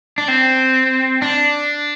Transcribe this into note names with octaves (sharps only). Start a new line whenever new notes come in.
D4
C4
D4